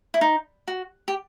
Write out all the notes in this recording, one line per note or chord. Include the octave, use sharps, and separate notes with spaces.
E4
D#4
F#4
G4